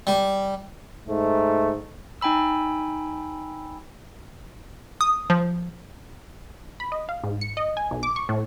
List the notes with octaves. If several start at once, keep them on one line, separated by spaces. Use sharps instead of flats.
G3
G#2 A3
D#4 G5 G#5 B5 E6
D#6
F3
B5
D#5
F5
G#2
C#7
D#5
G#5
B1
D6
C#6
A2